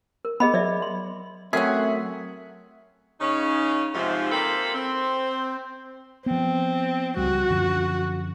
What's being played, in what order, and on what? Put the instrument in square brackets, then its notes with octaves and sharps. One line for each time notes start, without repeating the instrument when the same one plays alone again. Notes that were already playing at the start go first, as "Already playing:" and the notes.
[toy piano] A#4
[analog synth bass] B3 [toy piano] G#4 D#5 B5
[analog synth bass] F#3 [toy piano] D5 E5
[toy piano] C6
[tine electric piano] F#3 A3 A#4 [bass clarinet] C4 [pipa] C#4 G#4 [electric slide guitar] E5 F#5
[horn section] C#3 C#4 D#4
G#2 C3 F3
A#3 C4 F4 A4 G5 B5
C4
[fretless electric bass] F3 B3 [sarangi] C4
[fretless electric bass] C#2 G3 [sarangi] F#4
[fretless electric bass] F#2 D3 F3